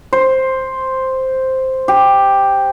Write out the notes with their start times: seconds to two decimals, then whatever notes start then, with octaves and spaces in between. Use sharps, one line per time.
0.13 C5
1.88 G4